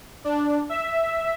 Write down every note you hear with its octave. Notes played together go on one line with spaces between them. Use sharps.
D4
E5